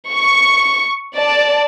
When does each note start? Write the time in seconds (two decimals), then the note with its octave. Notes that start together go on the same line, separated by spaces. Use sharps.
0.11 C#6
1.16 D5 A5